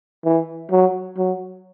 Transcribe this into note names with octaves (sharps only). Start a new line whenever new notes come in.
E3
F#3
F#3